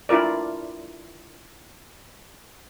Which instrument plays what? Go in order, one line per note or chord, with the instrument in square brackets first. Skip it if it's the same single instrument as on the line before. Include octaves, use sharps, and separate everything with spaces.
[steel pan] D4 E4 F4 A#4 D5